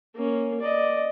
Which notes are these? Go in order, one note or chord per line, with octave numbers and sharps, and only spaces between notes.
A#3 C#4
D5 D#5